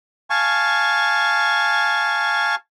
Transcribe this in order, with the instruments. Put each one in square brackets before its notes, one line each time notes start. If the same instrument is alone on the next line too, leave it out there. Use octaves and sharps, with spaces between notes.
[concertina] F5 G#5 A5 C#6